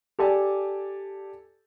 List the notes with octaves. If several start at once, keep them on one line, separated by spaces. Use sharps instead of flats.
G4 A4 D5 G#5 A5